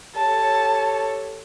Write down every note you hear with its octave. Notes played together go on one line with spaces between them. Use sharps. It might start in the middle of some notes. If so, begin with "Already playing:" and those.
G4 A4 C#5 A5